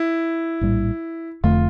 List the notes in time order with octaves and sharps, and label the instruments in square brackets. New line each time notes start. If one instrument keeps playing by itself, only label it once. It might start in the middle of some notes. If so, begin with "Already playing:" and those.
Already playing: [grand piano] E4
[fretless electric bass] A#1 A2 G3
[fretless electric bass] F1 F2 D3 A3 [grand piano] F4